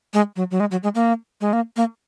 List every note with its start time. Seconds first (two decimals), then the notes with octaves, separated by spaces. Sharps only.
0.14 G#3
0.36 F#3
0.51 F#3
0.60 G#3
0.71 F#3
0.83 G#3
0.95 A#3
1.41 G#3
1.53 A#3
1.77 A#3